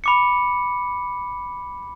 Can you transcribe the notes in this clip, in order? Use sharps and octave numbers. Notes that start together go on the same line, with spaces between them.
B5 D6 C#7